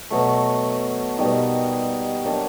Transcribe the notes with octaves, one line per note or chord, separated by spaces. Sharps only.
B2 F#3 A3
B2 G3 A#3 D#4
F#3 A#3 D4 G4